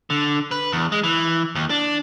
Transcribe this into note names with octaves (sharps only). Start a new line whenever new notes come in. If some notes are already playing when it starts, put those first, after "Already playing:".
D3
B4
E2
G#3
E3
D#2
D4